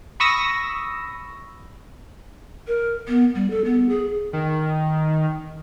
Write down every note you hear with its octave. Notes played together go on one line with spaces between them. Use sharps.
B5 C#6 D#6 E6 A#6
A#4
B3
G3
A4
B3
G#4
D#3